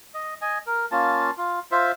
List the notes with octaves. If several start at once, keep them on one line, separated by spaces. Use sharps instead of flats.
D#5
D#5 G#5
A#4
A#3 C#4 F4 A5
F4
F4 C5 E5